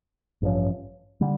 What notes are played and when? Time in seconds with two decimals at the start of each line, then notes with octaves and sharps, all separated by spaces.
0.42 A1 G2 F3 C#4
1.21 D3 G3